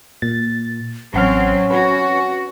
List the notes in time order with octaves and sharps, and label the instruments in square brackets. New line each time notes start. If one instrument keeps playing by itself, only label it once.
[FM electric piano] A#2 A6
[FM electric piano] A1 F#5 F6 [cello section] F#3 C4 [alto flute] C#4
[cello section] F#4 [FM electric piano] B4